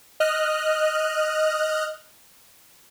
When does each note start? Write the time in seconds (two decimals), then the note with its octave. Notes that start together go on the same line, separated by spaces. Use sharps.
0.20 D#5 F6 F#6